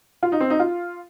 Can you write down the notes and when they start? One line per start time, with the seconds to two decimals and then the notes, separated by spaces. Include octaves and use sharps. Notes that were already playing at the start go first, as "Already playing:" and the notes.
0.23 F4
0.32 D#4
0.40 C4
0.50 D#4
0.60 F4